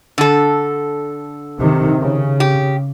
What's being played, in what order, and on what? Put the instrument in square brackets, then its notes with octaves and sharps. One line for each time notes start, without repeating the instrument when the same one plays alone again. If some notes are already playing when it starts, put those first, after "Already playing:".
[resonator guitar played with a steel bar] D3 A4
[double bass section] C3 D#3
C#3
[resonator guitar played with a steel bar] G4